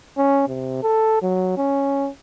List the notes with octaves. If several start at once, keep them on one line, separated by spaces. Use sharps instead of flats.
C#4
C3
A4
F#3
C#4